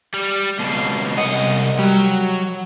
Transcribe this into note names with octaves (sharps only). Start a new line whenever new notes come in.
G3
C#2 B2 C7
C2 D#5 F#5
F#3 G3